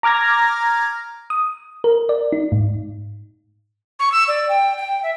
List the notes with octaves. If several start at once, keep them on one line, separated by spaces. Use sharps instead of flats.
A#5 D6 F6 G#6 A#6
D#6
A#4
D5
D#4
G#2
C#6
E6
D5
G5
G5
E5